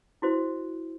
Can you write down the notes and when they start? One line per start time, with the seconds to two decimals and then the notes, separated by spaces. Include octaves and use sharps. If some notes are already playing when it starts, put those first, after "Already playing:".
0.22 E4 F#4 C5